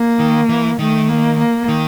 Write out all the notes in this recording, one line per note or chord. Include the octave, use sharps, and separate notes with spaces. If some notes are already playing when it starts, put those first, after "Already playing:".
Already playing: A#3
D#3
E3
D#3 A3
A#3
A#3
D#3